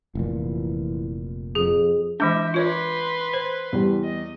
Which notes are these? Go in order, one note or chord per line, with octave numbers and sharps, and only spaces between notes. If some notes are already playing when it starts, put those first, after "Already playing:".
F1 A#2 E3
F2 G#4
E3 G#3 D4 E5 D6 G6
F4 B4 C#5 D5 C6
C5
E2 G3
D#5